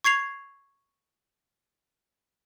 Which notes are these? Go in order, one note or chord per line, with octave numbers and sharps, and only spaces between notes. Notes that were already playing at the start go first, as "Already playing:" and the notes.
C#6 G#6 C7 F7